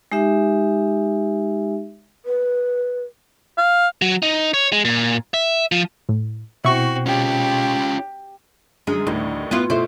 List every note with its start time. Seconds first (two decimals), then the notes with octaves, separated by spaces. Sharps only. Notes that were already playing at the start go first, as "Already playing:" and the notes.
0.12 G#3 D#4 G4 E5
2.25 B4
3.58 F5
4.02 F#3
4.23 D#4
4.54 C#5
4.73 G#3
4.85 A#2
5.34 E5
5.72 F3
6.09 A2
6.65 B2 C4 E4 F#4 C#6
7.06 C#4 F4 G4
8.87 F#2 D3 G#3
9.07 A1 D2 A2 D#3
9.51 B3 E4 F4
9.70 B2 A3 E4 C5